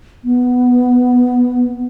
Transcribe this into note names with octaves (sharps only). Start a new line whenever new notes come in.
B3